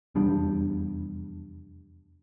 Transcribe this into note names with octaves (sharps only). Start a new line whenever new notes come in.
F1 E2 G3 D4